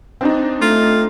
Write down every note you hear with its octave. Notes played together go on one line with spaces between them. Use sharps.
C4 D4 D#4
A3 F4